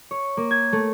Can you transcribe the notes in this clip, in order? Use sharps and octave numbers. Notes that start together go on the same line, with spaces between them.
C#5
A#3
G#6
A3